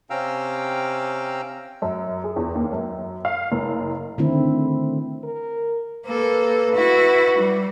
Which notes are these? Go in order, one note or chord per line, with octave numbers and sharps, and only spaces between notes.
C3 C#4 F5 G5 A#5 E6
F#2
G#4
E2
D#2
F#2
F5
F#1
D3 D#3 A3 C4 E4
A#4
A#3 A4 B4
E4 F#4
G3